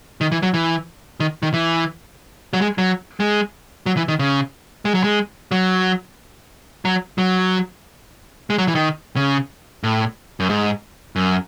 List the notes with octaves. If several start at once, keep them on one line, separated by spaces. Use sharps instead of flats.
D#3
E3
F#3
E3
D#3
D#3
E3
F#3
G#3
F#3
G#3
F#3
E3
D#3
C#3
G#3
F#3
G#3
F#3
F#3
F#3
G#3
F#3
E3
D#3
C#3
A2
F#2
G#2
F#2